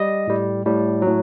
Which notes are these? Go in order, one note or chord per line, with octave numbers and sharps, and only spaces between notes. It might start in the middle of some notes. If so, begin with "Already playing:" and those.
Already playing: G3 D#5
A2 G3
A2 G3
A2 F#3